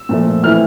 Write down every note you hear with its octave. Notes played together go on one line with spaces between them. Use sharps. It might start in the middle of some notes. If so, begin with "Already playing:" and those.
Already playing: E6
A#2 F3 A3
E3 A3 C4 E4 F6